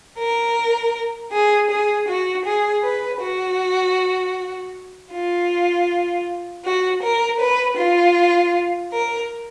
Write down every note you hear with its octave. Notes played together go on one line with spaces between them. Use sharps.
A#4
G#4
G#4
F#4
G#4
B4
F#4
F4
F#4
A#4
B4
F4
A#4